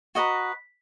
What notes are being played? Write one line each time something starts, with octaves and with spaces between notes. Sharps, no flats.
F#4 B4 D#5 A#5